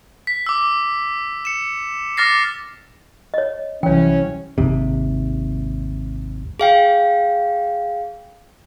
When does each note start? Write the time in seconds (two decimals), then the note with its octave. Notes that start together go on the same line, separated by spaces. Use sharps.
0.27 B6
0.46 D6 E6
1.45 C#7 E7
2.17 D6 F6 A6 A#6 C7
3.34 C#5 D#5
3.83 C2 E3 F#3 C#4 E4 C#5 G5
4.58 G#1 D#2 C3
6.60 G#4 F5 G5